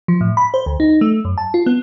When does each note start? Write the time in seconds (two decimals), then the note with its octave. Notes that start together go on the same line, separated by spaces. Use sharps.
0.08 F3
0.21 A2
0.37 B5
0.54 C5
0.66 D2
0.80 D#4
1.01 A3
1.25 F#2
1.38 A5
1.54 F4
1.66 B3